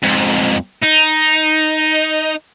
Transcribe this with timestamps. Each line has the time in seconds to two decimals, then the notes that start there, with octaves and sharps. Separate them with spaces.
0.03 F2 G#2
0.83 D#4